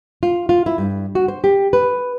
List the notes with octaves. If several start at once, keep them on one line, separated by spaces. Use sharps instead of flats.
F4
F4
E4
G2
F#4
C5
G4
B4